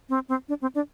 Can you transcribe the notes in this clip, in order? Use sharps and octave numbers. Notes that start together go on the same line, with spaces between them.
C4
C4
D4
C4
D4